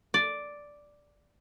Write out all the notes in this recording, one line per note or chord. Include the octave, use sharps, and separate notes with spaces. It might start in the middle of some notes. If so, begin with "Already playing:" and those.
D5